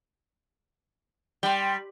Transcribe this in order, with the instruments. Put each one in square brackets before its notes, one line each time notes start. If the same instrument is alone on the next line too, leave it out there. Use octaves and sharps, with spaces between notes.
[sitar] G3 [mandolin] G5 C6